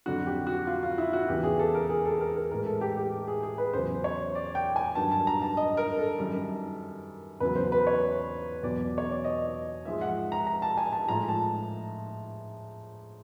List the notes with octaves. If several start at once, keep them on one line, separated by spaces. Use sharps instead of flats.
F2 D3 F#3 F#4
G4
F#4
F4
F4
E4
F#4
E2 C#3 E3 G4
G#4
A4
A#4
G#4
A4
A#4
A#4
A2 E3 G#3 A#4
A4
G4
G4
G#4
G#4
B4
E2 C#3 F#3 C5
C#5
D5
G5
G#5
G2 D#3 F#3 A5
A5
A#5
A5
D#5
A#4
A4
F#2 D#3 G3
E2 C#3 F#3 B4
C5
B4
C#5
E2 B2 F#3 D5
C#5
D5
D#5
G#2 F3 G#3 E5
F#5
A#5
A#5
A5
G#5
A5
A2 F3 G#3 A#5
A5